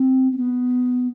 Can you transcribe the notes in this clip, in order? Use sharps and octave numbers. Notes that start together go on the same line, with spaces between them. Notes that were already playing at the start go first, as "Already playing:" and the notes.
Already playing: C4
C4
B3